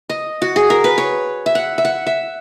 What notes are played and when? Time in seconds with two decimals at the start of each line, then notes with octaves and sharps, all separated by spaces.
0.09 D#5
0.42 F#4
0.56 G#4
0.70 A#4
0.84 B4
0.98 C#5
1.46 E5
1.55 F#5
1.78 E5
1.85 F#5
2.07 E5